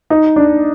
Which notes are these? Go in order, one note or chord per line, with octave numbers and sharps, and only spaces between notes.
D#4
D4